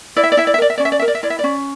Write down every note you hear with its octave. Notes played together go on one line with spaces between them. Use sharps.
E4 D5
E5
D5
E4 E5
D5
E5
A#4 D5
E5
C#4 D5
E5
D5
A#4 E5
D5
E5
E4 D5
E5
C#4 D5